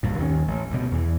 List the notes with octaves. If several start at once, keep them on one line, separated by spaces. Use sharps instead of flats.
B1 G2 A#2
D#2 D#3 F3 C#4
A1
D2 G2 B2
E2 E3